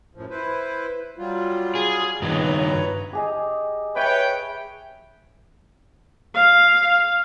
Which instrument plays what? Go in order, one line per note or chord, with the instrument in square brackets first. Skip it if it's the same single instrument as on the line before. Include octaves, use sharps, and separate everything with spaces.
[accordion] F#2 A2 F3
E4 B4 C5
F#3 G3 F4
[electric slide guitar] G#4
[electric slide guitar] G2 D#3 [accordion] B4 C#5 A#5
[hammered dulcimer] G4 G#4 D#5
[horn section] B4 C#5 G5 [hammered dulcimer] E5
[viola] F5